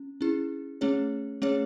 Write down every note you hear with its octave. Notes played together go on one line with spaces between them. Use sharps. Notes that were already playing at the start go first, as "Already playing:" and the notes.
Already playing: C#4
C#4 E4 G#4
A3 C#4 G#4 C#5
A3 C#4 G#4 C#5